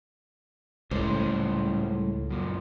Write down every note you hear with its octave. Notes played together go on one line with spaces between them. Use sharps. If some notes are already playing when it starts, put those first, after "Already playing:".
C#2 A2 G3 C#4 C5
F#2 A#2